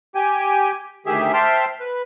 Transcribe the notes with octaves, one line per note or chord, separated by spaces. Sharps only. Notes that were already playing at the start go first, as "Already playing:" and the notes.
G4 G5 G#5
D2 D#3 G4 G#4 E5
C5 E5 G5 A5 C6 F6
B4